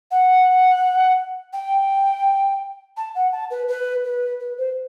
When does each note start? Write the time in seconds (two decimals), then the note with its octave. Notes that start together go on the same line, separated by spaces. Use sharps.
0.10 F#5
1.52 G5
2.96 A5
3.14 F#5
3.32 A5
3.50 B4
3.68 B4
4.04 B4
4.40 B4
4.57 C5